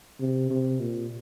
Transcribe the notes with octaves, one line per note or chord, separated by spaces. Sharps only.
C3
C3
A#2